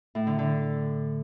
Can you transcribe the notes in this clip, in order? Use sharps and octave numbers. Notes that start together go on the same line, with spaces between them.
A2
D3
D3